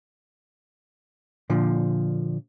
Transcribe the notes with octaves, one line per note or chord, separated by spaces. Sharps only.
A#2 D3 F3